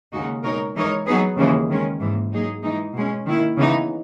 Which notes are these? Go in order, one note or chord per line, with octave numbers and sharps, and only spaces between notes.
D#2 C#3 G#3 D#4 F#4
B2 G#3 D#4 A#4 C#5
E3 G#3 D#4 A#4 C#5
F#3 B3 D#4 G#4 B4
D#2 C#3 E3 G#3
D#3 G#3 C#4
G#2 E3 A#3
F#3 A#3 D#4 G#4
E3 G#3 D#4
B2 G#3 C#4
D#3 A#3 E4
C#3 E3 B3 D#4